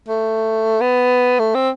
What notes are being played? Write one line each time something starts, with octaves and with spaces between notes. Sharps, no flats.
A3
B3
A3
C4